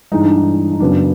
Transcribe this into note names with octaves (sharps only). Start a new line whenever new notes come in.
G2 E3 G#3 D#4
D4
D#4
D#4
F#2 C#3 F#3 B3 D4